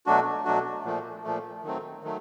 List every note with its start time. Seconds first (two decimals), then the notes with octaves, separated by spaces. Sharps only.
0.06 B2 F#3 A3 D4 F#4
0.45 B2 F#3 A3 D4 F#4
0.85 A#2 F3 A3
1.24 A#2 F3 A3
1.64 D#3 F#3 A3 C4
2.04 D#3 F#3 A3